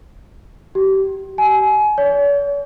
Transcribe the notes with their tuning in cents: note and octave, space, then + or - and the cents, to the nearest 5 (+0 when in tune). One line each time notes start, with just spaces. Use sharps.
G4 -30
G#5 +30
C#5 +45